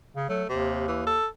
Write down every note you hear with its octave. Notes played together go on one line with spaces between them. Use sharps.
C#3
F#3 A3
D#2 C3
E3
A4